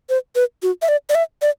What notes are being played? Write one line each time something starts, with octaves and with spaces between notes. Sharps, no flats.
C5
B4
F#4
E5
D5
D5
E5
D5